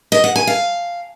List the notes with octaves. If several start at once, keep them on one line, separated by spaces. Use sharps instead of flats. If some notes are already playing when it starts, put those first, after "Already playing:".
D#5
F#5
G#5
F5